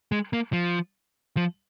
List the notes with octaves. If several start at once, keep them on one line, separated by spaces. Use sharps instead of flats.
G#3
A#3
F3
F3